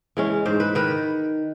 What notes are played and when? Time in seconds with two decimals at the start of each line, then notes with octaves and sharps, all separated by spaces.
0.17 E3 G#3 C#4
0.45 G#2 C5
0.60 B4
0.75 D#3 B4